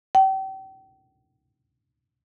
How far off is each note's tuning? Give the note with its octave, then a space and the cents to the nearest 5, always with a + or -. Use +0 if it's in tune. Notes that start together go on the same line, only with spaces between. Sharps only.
G5 -35